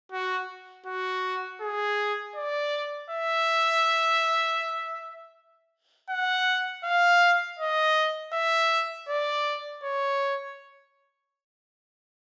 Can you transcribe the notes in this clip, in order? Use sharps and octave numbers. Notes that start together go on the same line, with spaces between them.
F#4
F#4
G#4
D5
E5
F#5
F5
D#5
E5
D5
C#5